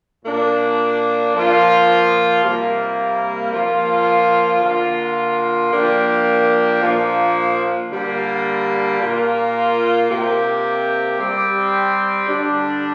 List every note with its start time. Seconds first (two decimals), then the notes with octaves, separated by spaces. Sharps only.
0.24 A#2 A#3 D4
1.34 F3 A#3 F4
2.44 C3 G3 A#3
3.53 F3 A#3 F4
4.62 D3 A#3 F4
5.72 F3 A#3 D4 G4
6.81 A#2 F3 A#3 D4
7.91 D3 G3 A#3
9.01 A#2 A#3 F4
10.10 C3 A#3 G4
11.20 G3 C4 G4
12.29 D3 G3 D4